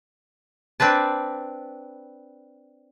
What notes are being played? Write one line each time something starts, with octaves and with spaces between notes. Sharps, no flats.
C4 D4 B4 A5